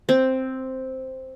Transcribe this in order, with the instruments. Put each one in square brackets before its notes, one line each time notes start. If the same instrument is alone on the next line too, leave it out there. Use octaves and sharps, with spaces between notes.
[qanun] C4